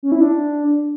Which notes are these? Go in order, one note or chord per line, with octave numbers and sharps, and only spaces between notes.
C#4
E4
D4